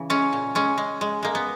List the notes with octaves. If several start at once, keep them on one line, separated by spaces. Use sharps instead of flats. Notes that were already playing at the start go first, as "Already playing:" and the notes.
Already playing: C#3 E3
G#3 C#4
A#2
G#3 C#4
G#3
G#3
G#3 A#3
B3